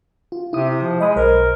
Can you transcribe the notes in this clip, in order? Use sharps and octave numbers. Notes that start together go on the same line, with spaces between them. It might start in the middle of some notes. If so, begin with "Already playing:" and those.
F4
C3 E4 D#6
F3
G#3 D#5 B5 D#6
B1 A#4 C5